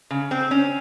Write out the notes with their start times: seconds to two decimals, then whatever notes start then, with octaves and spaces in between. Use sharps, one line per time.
0.11 C#3
0.31 C4
0.51 C#4